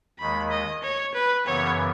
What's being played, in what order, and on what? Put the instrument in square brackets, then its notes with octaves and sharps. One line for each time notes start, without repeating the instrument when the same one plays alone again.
[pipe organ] D#2 D#3 G#3 [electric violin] B5
[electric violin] D#5
C#5
B4
[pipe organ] F#2 C#3 E3 B3 [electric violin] C#5